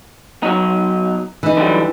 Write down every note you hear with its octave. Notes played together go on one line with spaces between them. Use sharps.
B1 F#3 D#4
E3 D#4
D3 F#3 G3